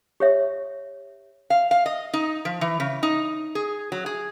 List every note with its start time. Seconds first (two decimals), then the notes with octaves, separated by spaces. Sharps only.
0.20 G4 C#5 E5
1.50 F5
1.71 F5
1.86 D#5
2.13 D#4
2.45 F3
2.61 E3
2.80 C#3
3.03 D#4
3.55 G#4
3.92 F#3
4.06 G#4